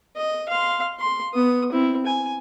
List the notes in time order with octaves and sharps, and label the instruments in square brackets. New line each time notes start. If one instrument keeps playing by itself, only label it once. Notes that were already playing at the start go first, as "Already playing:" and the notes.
[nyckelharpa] D#5
F5 C6
C6
B3 D#6
C4 E4
G#5